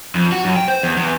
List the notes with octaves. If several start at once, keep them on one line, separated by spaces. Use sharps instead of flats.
F2
F#4
F#2
G5
C5
E2
E2